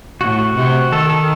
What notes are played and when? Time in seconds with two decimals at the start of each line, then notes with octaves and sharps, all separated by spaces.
0.21 A2 F#4
0.39 F#4
0.56 C3
0.91 D#3 A4
1.10 A4